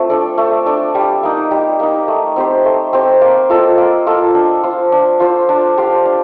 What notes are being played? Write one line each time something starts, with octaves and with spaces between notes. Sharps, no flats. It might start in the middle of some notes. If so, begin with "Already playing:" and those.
Already playing: A3 C4 F4
D4 A4 D5
A3
D4 A4 D5
G3
A#3 D#4
G3
A#3 D#4
A3
C4 G4 C5
A3
C4 G4 C5
A#3
F4 A4 D#5
A#3
F4 A4 D#5
D4
F4 C5
D4
F4 C5
D4
G4 C5 F5
D4